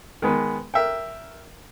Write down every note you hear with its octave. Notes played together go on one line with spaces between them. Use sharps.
D#3 G#3 B3
A#4 E5 G5